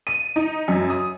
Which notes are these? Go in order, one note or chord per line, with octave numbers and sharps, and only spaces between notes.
D#7
D#4
F#2
D#6